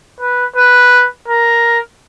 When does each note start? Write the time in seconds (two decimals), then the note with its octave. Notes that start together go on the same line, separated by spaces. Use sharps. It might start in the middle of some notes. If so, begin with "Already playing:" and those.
0.20 B4
0.56 B4
1.28 A#4